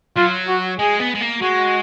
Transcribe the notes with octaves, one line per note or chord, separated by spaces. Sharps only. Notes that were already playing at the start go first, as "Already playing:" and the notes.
F#3 F4
F#4
G#3 G#4
B3
G#3
A#3
G#3 F#4